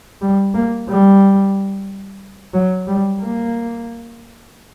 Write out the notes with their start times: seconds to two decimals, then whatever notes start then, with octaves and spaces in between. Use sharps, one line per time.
0.21 G3
0.54 A#3
0.89 G3
2.53 F#3
2.87 G3
3.21 A#3